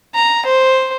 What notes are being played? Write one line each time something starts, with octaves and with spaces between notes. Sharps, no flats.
A#5
C5